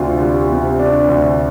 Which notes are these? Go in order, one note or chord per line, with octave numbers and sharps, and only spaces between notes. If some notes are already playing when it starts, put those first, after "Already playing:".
Already playing: D2 C3 D4 F4
G3
C3
D4
D2